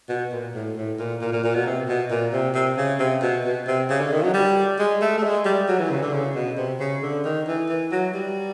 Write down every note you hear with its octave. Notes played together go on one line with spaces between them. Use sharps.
B2
A#2
A2
A2
A#2
A#2
A#2
A#2
B2
C3
B2
A#2
C3
C3
C#3
C3
B2
B2
C3
C#3
D3
D#3
F#3
G3
G#3
A3
A3
G#3
G3
F#3
E3
C#3
D3
C#3
B2
C3
C#3
D3
D#3
E3
E3
F#3
G3